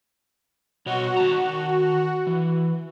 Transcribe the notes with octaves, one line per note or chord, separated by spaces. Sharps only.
B2 F#4 C#5 D#5
D#3 A5 A#5
E3